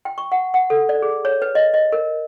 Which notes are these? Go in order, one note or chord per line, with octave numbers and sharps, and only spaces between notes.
G5
C#6
F#5
F#5
A4
D5
G#4
C#5
B4
D#5
D#5
A#4